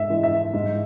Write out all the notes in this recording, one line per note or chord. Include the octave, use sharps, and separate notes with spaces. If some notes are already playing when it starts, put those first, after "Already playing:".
Already playing: G#2 E5
E3 G#3
E5
G#2